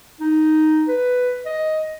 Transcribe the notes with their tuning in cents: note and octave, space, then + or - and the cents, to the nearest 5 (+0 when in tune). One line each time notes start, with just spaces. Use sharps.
D#4 +0
B4 +5
D#5 +5